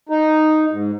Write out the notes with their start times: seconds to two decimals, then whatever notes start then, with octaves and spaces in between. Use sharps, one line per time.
0.09 D#4
0.71 G#2